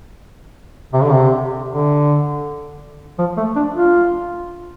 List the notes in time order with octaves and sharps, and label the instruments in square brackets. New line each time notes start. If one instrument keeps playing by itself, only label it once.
[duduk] C3
D3
C3
D3
F3
A3
D4
F4